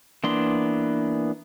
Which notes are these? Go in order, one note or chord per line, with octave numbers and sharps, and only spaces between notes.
E3 A#3 B3 D4 C6